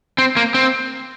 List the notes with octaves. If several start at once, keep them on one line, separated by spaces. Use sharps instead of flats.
C4
A#3
C4